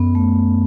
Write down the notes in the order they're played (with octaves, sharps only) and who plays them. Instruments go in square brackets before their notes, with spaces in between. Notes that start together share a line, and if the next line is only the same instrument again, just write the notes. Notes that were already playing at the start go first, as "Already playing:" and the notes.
Already playing: [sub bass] F#2 [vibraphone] B3
[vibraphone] A3